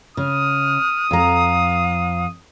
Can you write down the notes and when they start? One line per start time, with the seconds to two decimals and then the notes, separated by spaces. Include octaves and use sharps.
0.17 C#3 D#6 F6
1.11 F2 F5 A#5